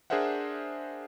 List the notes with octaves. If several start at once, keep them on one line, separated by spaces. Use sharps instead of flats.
D4 G#4 A#4 C5 E5 F#5